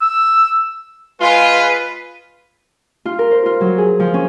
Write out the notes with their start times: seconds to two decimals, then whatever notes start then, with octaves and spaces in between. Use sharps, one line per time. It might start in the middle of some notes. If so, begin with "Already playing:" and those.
0.01 E6
1.20 G#3 F4 B4
3.05 F4
3.19 A#4
3.31 C5
3.46 F4
3.61 F#3
3.78 G#4
4.00 F3
4.14 C#4